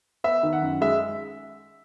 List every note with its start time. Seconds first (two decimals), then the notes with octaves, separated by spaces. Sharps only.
0.24 B3 E5
0.43 D#3
0.53 F#5
0.62 F#2
0.81 G#3 E5